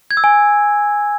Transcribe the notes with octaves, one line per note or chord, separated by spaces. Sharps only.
G#6
E6
G#5